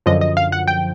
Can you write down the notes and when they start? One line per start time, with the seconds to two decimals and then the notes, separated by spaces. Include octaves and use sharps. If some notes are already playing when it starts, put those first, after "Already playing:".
0.06 F#2 D3 F3 D#5
0.21 D#5
0.37 F5
0.52 F#5
0.67 G5